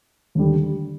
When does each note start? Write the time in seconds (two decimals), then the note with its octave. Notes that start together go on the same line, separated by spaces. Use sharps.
0.35 D#2 D3 G3